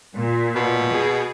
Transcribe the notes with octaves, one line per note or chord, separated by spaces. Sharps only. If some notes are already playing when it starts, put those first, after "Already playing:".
A#2
B2
G#4